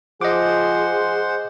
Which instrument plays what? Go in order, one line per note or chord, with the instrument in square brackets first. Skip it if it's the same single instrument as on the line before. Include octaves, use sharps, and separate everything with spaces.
[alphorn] F3 [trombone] G#4 [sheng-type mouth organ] C5 F#5 C6 [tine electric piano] D#5 D6